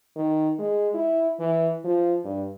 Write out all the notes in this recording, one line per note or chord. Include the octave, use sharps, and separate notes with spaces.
D#3
G#3
E4
E3
F3
G2